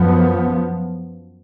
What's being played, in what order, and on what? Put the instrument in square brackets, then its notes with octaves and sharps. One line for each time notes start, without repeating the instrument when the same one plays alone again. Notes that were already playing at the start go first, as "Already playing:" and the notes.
Already playing: [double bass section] F#2 F3 B3